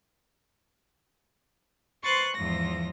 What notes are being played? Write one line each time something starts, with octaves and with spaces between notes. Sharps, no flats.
B4 C5 C6 C#6 F#6 A6
E2 G#2 F3 A#6